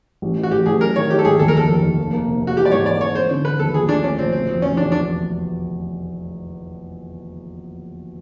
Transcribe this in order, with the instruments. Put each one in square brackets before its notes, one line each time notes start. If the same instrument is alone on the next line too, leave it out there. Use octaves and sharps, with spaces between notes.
[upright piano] A1
E3
[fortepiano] F#4
[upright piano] A1 [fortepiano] G4
[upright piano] A1 [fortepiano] G#4
[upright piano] F#3 [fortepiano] A#4
[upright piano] D#3 [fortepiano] C#5
[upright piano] D#3 [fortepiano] G4
[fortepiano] A4
[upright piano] G#1 [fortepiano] G#4
[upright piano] D#2 [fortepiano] A4
[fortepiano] A#4
[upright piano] F1 [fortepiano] A4
[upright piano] F1
F1
A#3
A#3
C3
A#3
[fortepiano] F#4
[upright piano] E3 [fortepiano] G4
[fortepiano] D5
[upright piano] G#2 [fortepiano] C#5
[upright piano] E3 [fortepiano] D5
[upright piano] C4 [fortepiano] C#5
[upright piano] C4 [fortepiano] C5
[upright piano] D3
[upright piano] C4 [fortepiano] B4
[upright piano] D#2 [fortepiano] A4
[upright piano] A#1 [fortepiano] G#4
[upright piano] A3 [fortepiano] D4
[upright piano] A3 [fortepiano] C#4
[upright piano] A#1 [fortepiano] C4
[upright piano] B2 [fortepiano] C4
[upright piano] F1 [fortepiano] C4
[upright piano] F1 [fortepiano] C#4
[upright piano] E2 [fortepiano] D4
[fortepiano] D4